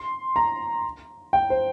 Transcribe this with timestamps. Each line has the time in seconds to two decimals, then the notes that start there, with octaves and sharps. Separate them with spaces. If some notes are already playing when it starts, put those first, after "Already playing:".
Already playing: C6
0.36 A#5
1.33 G5
1.50 C5